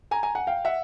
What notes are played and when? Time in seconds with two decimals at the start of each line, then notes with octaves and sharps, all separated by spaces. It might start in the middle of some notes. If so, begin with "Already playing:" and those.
0.11 G#5 A#5
0.23 G#5 A#5
0.35 F#5 G#5
0.47 F5 G5
0.65 E5 F#5